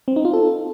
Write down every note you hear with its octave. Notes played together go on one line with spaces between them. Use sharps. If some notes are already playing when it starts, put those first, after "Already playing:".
C4
D#4
F4
A4